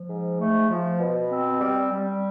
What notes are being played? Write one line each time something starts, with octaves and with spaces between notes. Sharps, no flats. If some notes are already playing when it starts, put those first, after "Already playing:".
Already playing: F3
G#2
A3
F3
B2
C4
G3
G3